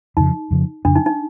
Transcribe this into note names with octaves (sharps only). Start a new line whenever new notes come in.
F2 C#3 F3 D#4
F2 C#3 F3
F2 C#3 F3 D4
D#4
D#4